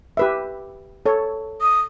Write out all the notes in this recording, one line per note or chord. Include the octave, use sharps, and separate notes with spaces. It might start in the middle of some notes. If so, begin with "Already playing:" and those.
G4 B4 E5
A4 C#5
D#6